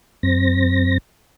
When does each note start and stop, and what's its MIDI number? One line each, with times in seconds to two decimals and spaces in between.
0.23 0.98 42
0.23 0.98 60
0.23 0.98 94